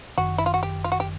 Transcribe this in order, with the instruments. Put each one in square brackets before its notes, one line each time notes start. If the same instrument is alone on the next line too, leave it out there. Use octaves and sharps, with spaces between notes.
[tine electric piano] G1 F#2 D#3 [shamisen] F#4
[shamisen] E4
F4
F#4
G4
F4
F#4
G4